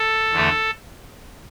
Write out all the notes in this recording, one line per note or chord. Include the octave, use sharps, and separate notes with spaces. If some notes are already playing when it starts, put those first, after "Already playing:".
Already playing: A4
E2 D3 A3